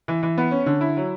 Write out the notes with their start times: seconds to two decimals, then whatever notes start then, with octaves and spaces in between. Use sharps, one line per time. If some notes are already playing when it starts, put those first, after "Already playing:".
0.08 E3
0.23 E3
0.38 B3
0.51 C#4
0.66 D3
0.81 E4
0.97 F#3